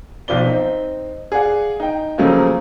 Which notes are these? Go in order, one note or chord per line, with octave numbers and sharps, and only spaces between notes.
B1 F3 D5 G7
C4 D#4
G#4 D5 F5 F#5
D#4 G5
C#3 F3 F#3 A3 A#3 C#4